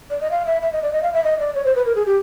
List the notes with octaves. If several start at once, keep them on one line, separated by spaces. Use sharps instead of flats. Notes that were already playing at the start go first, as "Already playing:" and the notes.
D5
D#5
F5
E5
E5
D#5
D5
D#5
F5
E5
D#5
D5
C#5
C5
B4
A#4
G#4
G4